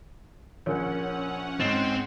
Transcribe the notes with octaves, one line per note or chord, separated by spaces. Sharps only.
A#1 C#4 A#4 C#5 F#5
G#2 C4 A6